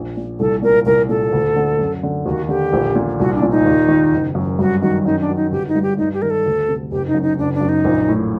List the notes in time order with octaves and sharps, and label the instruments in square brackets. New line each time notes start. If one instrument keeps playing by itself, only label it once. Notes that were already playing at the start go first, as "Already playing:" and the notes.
Already playing: [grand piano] A#1
A#2
[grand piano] C2 [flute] A4
[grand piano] A#2 [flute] A#4
[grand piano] C2 [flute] A#4
[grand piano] A#2 [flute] A4
[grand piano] D2
D3
F#2
D3
[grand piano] D#2 [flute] F#4
[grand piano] D3 [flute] G4
[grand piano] A#1
A#2
[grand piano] C2 [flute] F#4
[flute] D4
[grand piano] A#2
[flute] D#4
[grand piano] D#2
D#3
F#1
F#2
[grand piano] G2 [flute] F#4
[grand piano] D#3 [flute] F#4
[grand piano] F#2 [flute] D#4
[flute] D4
[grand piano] F#3
[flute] D#4
[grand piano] G1 [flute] G4
[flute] D#4
[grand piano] G2
[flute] G4
[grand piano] G2 [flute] D#4
[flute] G4
[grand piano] D#3 [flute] A#4
[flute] A4
[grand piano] D2
C3
[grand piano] F#1 [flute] G4
[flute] D#4
[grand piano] F#2
[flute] D#4
[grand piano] F#1 [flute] D4
[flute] D4
[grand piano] F#2
[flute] D#4
[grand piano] A#1
A2